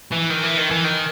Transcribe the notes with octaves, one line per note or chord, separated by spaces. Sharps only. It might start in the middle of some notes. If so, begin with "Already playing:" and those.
E3
D#3
E3
D#3
E3
D#3